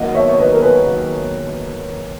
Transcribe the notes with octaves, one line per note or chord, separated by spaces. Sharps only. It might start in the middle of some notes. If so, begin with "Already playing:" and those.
Already playing: D#3 F#3 A#3 D#5 F#5
C#5 E5
C#5
D#3 F#3 A#3 B4 D#5
A#4
G#4 B4
D#3 F#3 A#3